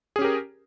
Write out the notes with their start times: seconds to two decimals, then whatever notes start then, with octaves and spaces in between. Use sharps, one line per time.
0.16 G#4
0.19 C#4
0.22 G4
0.24 A#4